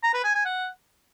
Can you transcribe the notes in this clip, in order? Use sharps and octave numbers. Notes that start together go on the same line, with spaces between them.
A#5
B4
G#5
G#5
F#5